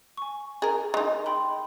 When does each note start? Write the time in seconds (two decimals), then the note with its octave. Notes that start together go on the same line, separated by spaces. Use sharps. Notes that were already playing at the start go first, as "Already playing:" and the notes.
0.17 G#5 C#6
0.62 G#4 A#4
0.94 G#3 D#4
1.26 G5 B5 C6